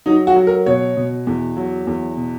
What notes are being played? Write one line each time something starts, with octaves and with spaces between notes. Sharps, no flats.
F#3 D#4
F#4
F#3
A#4
B2 C#5
B2
E2
F#3
E2
B2